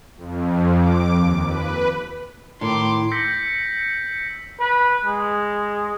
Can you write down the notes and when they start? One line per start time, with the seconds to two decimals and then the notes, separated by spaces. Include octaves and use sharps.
0.17 F2
0.77 D6
1.11 D#2
1.45 B4
2.61 A2 D#3 C6 D6
3.11 E6 G6 A#6 B6 C#7
4.60 B4
5.05 G#3